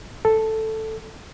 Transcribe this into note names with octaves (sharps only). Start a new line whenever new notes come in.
A4